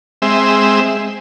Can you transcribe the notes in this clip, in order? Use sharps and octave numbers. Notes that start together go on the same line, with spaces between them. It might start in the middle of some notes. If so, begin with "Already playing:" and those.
G#3 C4 E5